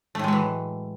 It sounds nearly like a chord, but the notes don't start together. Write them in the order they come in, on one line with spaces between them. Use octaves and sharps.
A3 A2 G#3 F#3 E3